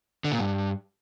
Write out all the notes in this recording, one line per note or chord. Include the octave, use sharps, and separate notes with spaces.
D3
A#2
G2